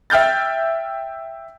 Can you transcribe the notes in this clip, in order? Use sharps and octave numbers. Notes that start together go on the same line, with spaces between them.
E5 G5 F6 G6 A6